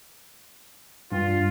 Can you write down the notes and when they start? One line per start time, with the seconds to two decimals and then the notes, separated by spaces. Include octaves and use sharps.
1.12 G2 F4